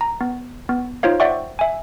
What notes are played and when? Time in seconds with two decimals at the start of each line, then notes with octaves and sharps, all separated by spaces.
0.01 A#5
0.21 B3
0.69 B3
1.03 D#4 F4 C5 C#5 F5
1.20 C5 D5 E5 F#5 G5 C#6
1.59 E5 G#5